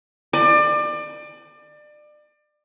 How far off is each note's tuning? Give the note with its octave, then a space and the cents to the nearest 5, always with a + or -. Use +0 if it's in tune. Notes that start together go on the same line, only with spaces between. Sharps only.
D5 +30